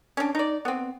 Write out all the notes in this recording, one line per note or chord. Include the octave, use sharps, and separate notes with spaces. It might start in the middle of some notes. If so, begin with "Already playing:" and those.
C#4 D4
D#4 D5
B3 C4